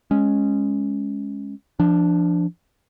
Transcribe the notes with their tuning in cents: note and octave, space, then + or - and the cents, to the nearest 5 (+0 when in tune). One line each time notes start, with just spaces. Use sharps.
G#3 +0 C#4 +0
F3 -20 D4 +0